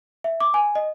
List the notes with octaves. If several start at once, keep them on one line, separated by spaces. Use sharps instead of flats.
E5
D6
G#5
D#5